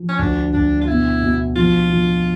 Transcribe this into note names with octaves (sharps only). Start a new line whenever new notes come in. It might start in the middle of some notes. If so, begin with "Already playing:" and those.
Already playing: F3
C#4
D2 D4
D2 D4
F4
B2 E4
B2
F3 F4
F3